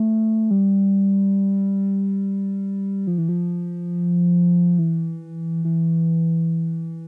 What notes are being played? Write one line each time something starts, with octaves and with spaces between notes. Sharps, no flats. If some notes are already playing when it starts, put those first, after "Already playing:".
Already playing: A3
G3
F3
E3
F3
E3
E3